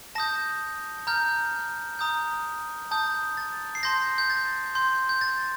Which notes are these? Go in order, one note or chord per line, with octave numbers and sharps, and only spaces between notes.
A5 D#6 G6 A#6
A#5 F6 G6
A#5 D#6 G6
A5 D#6 G6
A6
C7
A5 C6 G6 A#6
G6
A6
C6 G6
G6
A6